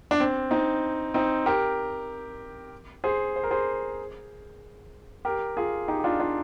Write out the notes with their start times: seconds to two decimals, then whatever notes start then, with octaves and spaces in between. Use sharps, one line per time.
0.11 D4
0.20 C4
0.51 C4 D#4
1.14 C4 D#4
1.46 G4 A#4
3.04 G#4 C5
3.36 C5
3.43 A#4
3.51 G#4 C5
5.25 G4 A#4
5.57 F4 G#4
5.88 D#4 G4
5.99 G4
6.04 D4 F4
6.20 D4 F4